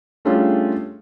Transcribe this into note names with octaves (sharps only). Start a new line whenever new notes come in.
G3 A3 C#4 D4 F4 G#4